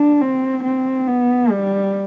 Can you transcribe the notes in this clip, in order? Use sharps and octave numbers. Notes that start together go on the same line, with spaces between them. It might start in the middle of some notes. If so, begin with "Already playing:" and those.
Already playing: D4
C4
C4
B3
G3